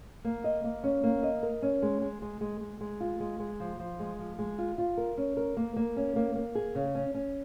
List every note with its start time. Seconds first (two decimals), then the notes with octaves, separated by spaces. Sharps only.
0.24 A#3
0.44 D#5
0.64 A#3
0.84 C#4
1.03 A#3
1.23 D#5
1.43 A#4
1.62 C#4
1.82 G#3
2.02 G#3
2.22 G#3
2.41 G#3
2.61 G#3
2.81 G#3
3.00 F4
3.20 G#3
3.40 G#3
3.60 F3
3.79 F3
4.00 G#3
4.19 F3
4.39 G#3
4.58 F4
4.78 F4
4.97 A#4
5.17 C#4
5.37 A#4
5.57 A#3
5.76 A#3
5.96 C#4
6.16 A#3
6.35 A#3
6.55 G#4
6.75 C#3
6.95 C#4
7.15 C#4